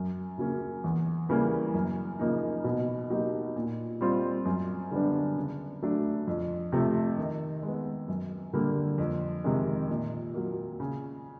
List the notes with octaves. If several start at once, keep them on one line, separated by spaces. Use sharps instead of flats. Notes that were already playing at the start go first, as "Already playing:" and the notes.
Already playing: F#2
C#3 F#3 A#3 C#4
E2
C#3 E3 G3 A#3
F#2
C#3 F3 A#3 D#4
B2
F#3 A#3 D#4 G4
A#2
G3 C4 F4
F#2
D3 G3 B3 D4
C#3
F#3 A3 D4
F2
C3 F3 A3
D#3
G#3 B3
F#2
D3 G3 A#3
F2
C3 D#3 G#3
A#2
F#3 A#3
C#3